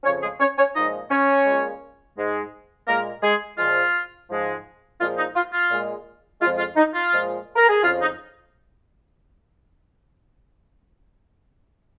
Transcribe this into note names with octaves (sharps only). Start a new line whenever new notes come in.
F2 C#3 F3 C#4 C#5
G#3 G#4
C#4 C#5
C#4 C#5
A#2 F3 G#3 D#4 D#5
C#4 C#5
A#2 G#3
G#2 G#3
A#2 G#3 A#3 A#4
G#3 G#4
A#2 F3 G#3 F4
G#2 F3 G#3
A#2 F3 G#3 F4
D#4
F4
F4
A#2 G#3
F2 F3 G#3 F4
F4
D#4
F4
A#2 F3 G#3
A#4
G#4
F2 C#3 F3 F4
D#4